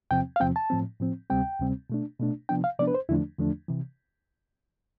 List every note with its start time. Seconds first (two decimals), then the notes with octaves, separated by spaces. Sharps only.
0.11 E2 C3 F3 C4 G5
0.36 F5
0.40 E2 C3 F3 C4 G5
0.56 A5
0.70 A2 F3 C4
1.00 A2 F3 C4
1.30 D2 C3 G3 C4 G5
1.59 D2 C3 G3 C4
1.90 B2 A3 D4
2.19 B2 A3 D4
2.49 C3 F3 B3 D4 G5
2.64 F5
2.79 C3 F3 B3 D4 D5
2.88 B4
2.94 C5
3.09 E2 D3 F3 A3 D4 E4
3.39 E2 D3 F3 A3 D4
3.68 C3 E3